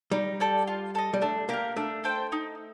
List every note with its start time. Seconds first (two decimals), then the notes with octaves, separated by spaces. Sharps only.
0.11 G3 D#4
0.40 A4 D5 G5
0.68 F4
0.95 A4 D#5
1.14 G3
1.21 A3 D4
1.49 A#3 G4 A#4
1.77 A3 D4
2.04 A4 C5 G5
2.32 D#4